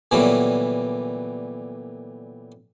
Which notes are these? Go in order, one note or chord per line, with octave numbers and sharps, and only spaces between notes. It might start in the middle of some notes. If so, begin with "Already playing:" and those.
A#2 D3 E3 F#3 G3 B3